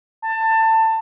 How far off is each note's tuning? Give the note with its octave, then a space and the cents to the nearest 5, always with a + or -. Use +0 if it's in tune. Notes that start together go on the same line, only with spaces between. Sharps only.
A5 +20